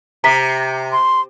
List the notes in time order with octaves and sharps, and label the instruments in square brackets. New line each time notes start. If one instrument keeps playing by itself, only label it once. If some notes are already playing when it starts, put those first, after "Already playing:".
[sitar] C3 [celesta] A#5 B6
[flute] C6